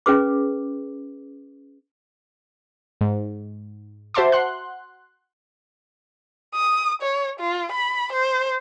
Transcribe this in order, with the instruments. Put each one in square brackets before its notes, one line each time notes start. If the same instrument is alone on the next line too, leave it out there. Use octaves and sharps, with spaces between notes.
[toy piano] C#4 G#4 B4 D6
[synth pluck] G#2
F#4 C5 E5 A5 C6 D6
F#5 C6 F#6
[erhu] D#6
C#5
F4
B5
C5